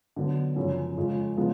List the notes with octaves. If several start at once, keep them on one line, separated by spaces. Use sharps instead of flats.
D3 F#3 B3
F#2 C#3 F3
F2 C#3 G#3 C#4 F4
C#3 F3 G#3 B3 F4